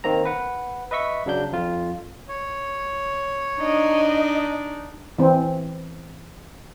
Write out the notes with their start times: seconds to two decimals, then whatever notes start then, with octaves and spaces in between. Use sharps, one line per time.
0.04 D#3 A#3 C4 A#5
0.25 B4 F#5
0.91 B4 D#5 E5 C#6 B6
1.26 C#3 F#3 D4 G6
1.52 F2 F4
2.28 C#5
3.61 D4 D#4 D#5
5.19 E3 C4